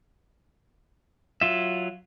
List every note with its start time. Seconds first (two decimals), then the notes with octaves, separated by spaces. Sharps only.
1.41 F#3 F4 E5